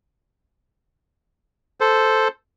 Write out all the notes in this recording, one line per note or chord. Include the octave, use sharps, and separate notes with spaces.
A4 C5